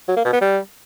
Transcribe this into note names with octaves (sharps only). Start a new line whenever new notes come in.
F#3
A#3
B2
B3
G3